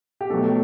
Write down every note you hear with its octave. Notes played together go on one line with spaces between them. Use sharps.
G4
B2 F#3 A3 A4